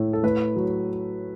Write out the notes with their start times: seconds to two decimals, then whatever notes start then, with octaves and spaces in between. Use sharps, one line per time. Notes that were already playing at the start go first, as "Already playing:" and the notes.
Already playing: A2 A3
0.13 A4
0.23 A3 B4
0.56 F#3